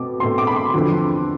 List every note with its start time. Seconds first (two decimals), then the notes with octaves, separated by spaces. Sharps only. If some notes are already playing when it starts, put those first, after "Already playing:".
Already playing: B2 A3 C4 D6
0.20 B2 A3 C4 C6
0.38 D6
0.47 B5
0.56 C6
0.74 E2 D3 F3 C4